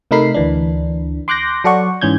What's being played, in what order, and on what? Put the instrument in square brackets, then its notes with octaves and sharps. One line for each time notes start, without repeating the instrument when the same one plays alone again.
[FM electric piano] C3 A3 D#4 A#4 B5 C7
D2 E3 D4
C6 D6 F#6 G6 A#6
F#3 A4 D5 F#5 C#6
G#2 E3 C#4 G6 G#6